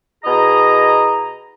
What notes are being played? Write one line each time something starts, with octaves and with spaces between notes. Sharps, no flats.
B2 E4 G#4 D#5 A#5